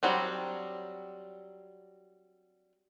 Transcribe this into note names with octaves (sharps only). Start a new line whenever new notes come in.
F#3 G3 C4 D4